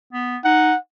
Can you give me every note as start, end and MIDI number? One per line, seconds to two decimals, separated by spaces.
0.13 0.37 59
0.44 0.72 63
0.44 0.77 78